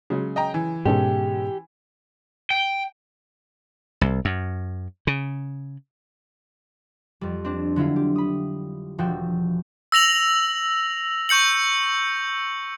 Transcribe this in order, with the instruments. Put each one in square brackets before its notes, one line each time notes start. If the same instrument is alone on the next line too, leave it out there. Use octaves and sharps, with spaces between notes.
[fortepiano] C#3 F#3 G#3
[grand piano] D#5 G5 A#5
E3
[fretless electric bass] G#2 B2 [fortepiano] G#3 C#4 A4 [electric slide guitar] G4
[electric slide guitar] G5
[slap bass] C2
F#2
C#3
[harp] F2 G3
C4 D4
D3 F#3 E4 F4
G4
B5 D#6
E1 F3 F#4 G5 E6
[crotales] E6 A#6 F7 F#7
C#6 G6 C#7 F#7